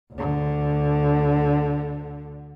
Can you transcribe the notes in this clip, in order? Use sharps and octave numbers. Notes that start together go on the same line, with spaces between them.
D2 D3